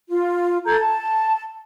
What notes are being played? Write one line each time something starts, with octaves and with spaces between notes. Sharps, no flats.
F4
A4 A#5 G6 G#6
A5